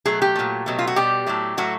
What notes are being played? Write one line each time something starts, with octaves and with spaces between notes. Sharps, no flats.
B2 F#3 A3 G#4
G4
A#2 F#3 A3
B2 F#3 A3
F4
F#4
B2 G3 G4
A2 F#3 A3
A2 F#3 A3 F#4